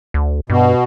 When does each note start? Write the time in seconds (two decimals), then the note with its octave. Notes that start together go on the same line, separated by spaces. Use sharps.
0.14 D2
0.50 G2 B2